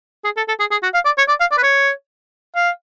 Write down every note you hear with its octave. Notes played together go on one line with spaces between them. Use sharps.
G#4
A4
A4
G#4
G#4
F#4
F5
D5
C#5
D5
F5
D5
B4
C#5
F5